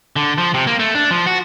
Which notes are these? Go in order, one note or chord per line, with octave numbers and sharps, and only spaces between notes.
D3
F3
C3
A#3
A3
D4
F3
F#4